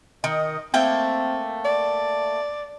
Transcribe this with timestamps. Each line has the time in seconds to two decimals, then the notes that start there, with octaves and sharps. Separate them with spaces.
0.24 D#3 D#5
0.74 A3 A#3 C4 G5
1.65 D5